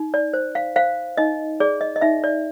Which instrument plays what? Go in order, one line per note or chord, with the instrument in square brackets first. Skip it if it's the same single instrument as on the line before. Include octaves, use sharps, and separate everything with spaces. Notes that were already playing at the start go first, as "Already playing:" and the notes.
Already playing: [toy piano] D#4
D5
C5
F5
C5 F5
D#4 D#5
G#4 D5
D#5
D#5
D#4 E5
D5